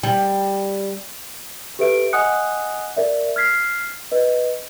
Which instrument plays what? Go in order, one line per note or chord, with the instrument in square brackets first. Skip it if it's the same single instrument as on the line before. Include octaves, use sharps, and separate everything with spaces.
[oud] G3
[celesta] G4 A4 B4 E5 D7
D#5 F#5 G#5 D#6 F#6 C#7
A#4 D5 E5
F6 G#6 B6 C7
B4 D#5